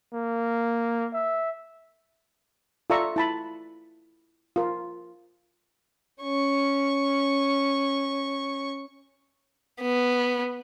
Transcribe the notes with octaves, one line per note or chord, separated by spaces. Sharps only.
A#3
E5
F4 A4 D5 E5 A#5 C#6
E4 A5 B5
F4 A#4
C#4 C#6
B3